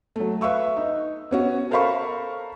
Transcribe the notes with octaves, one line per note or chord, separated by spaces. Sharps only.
F#3 A3
B4 E5 F5 C#6 E6
D#4
B3 C#4 F#4
A4 A#4 C5 F5 B5 C#6